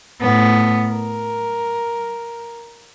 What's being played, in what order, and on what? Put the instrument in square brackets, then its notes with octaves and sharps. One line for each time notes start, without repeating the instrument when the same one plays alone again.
[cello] A2 B3
A#4